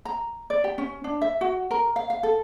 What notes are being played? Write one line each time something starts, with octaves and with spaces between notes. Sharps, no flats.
A#5
D5
G4
C#4
D4
E5
F#4
A#4
F5
F5
A4